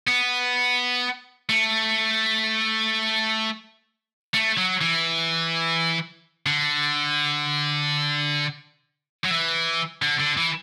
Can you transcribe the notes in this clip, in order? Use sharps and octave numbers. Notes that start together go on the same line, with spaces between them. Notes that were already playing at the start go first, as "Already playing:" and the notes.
B3
A3
A3
F#3
E3
D3
F#3
E3
D3
D3
E3